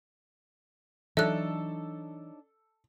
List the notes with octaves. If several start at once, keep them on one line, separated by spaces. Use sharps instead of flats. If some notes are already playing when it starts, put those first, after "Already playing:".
E3 F#3 D4 D#4 A4 C#5 E5 F#6